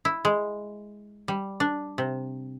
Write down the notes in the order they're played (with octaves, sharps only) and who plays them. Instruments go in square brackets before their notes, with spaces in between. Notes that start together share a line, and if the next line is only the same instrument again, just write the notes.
[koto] E4
G#3
G3
D4
C3